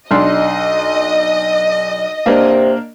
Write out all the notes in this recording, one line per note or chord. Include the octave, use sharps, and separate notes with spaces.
B1 D4 D#5 C6
C3 A#3 D4 A#4